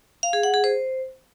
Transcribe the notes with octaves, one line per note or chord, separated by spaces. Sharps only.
F5
G#4
F#5
G#4
C5